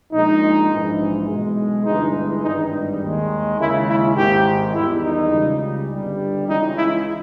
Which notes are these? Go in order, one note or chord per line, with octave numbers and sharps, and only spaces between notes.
A#1 A#2 G#3 D#4
A#1 G#2 E3 G#3
B1 B2 G#3
G1 G2 E3 G#3 D#4
G#1 G2 G3 D#4
D#2 D#3 G#3
D#2 C#3 G#3 E4
E4
G#1 G#2 D#3 G#3 G4
E2 D#3 G3 E4
D#4
C#2 C#3 G3
G1 G2 G3
C#2 C#3 E3 G#3 D#4
E4